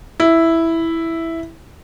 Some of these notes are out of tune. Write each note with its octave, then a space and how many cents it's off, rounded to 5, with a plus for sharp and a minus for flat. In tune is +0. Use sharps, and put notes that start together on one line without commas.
E4 +0